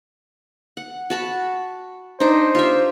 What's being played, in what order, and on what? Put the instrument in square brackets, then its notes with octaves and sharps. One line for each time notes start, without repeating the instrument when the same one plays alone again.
[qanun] F#5
F#4 A5 B5
[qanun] D4 D#4 [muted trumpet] C5
[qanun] F4 G4 E5